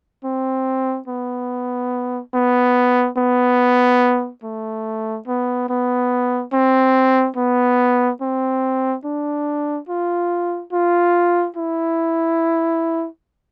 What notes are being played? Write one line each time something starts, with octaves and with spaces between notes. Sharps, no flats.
C4
B3
B3
B3
A3
B3
B3
C4
B3
C4
D4
F4
F4
E4